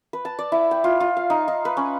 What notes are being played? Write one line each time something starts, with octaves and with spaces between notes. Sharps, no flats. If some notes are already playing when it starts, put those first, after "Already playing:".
B4
A5
D5
E4
G5
F4
F4
F5
D#4
D#4
B4
C#4